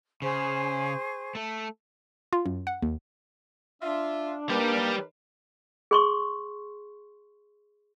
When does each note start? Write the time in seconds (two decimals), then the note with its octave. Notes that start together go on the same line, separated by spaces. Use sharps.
0.22 C#3 G#4 C5 C#6
1.35 A3 A4
2.33 F4
2.46 F#2
2.67 F#5
2.82 D#2
3.82 D4 F4 E5
4.50 G3 A#3 D#4 G4 A#4 B4
5.91 G#4 C6 C#6